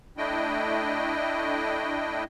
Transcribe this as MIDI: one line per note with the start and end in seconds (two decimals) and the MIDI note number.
0.17 2.24 57
0.17 2.24 62
0.17 2.24 64
0.17 2.24 75
0.17 2.24 79